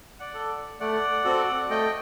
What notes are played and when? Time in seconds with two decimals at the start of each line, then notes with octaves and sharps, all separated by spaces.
0.20 D5 F#5
0.35 A4
0.80 A3 D5 F#5
1.24 C4 F#4 A4
1.70 A3 D#5 G5